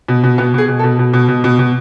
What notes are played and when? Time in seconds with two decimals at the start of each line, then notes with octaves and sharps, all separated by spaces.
0.08 B2
0.24 B2
0.38 B2 B3
0.54 B2 G#4
0.68 B2
0.79 A4
0.84 B2
0.99 B2
1.14 B2
1.28 B2
1.44 B2
1.59 B2